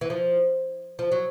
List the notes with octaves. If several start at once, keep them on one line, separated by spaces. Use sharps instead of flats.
E3
F3
F3
F#3